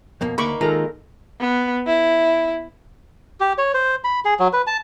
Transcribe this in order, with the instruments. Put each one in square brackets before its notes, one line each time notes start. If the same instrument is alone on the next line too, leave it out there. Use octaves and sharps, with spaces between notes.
[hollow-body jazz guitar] F2 B2 A#3
[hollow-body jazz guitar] D2 [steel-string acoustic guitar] A#3 D#4 [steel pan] B5 C#6 D6
[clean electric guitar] D#3 [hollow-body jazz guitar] G#3 F4 [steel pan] A4 A#4 A#5
[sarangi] B3
E4
[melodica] G4
C#5
C5
B5
G#4
F#3
B4
A5